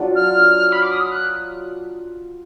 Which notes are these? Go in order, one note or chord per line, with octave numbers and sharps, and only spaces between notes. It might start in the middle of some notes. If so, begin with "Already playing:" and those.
Already playing: F#3 D4 F4
F6
B5
D6
D#6
F6
F#6